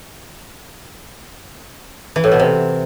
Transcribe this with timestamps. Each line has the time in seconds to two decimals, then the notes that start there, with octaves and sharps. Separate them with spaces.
2.16 E3
2.24 A2
2.32 B2
2.39 C3